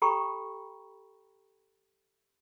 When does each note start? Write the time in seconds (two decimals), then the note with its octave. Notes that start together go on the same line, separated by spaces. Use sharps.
0.02 G4 A4 G5 A#5 B5 C#6